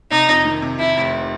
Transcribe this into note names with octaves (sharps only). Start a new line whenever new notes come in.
C3 D#4
F2
D#3
C3
F2 E4
F1